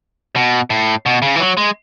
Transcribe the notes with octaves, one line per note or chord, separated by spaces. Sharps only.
B2
A2
B2
C#3
E3
F#3
G#3